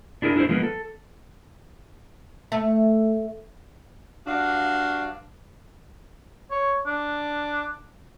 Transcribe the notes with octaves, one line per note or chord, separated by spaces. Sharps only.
D4 E4 G#4 A#4
D4 E4 G4 G#4 C5
F3 G#3 A#3 B3
A4
A3
G2 D4 F#4 F5
C#5
D4